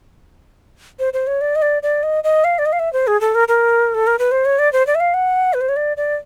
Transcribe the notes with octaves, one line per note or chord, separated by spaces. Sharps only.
C5
C5
C#5
D5
D#5
D5
D5
D#5
D#5
F5
D5
D#5
F5
E5
C5
G#4
A4
A#4
A#4
A4
A#4
B4
C5
C#5
D5
C5
D5
E5
F5
F#5
B4
C5
C#5
D5
D5